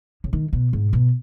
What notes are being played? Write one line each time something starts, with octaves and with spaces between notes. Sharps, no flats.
C#3
D#3
B2
G#2
B2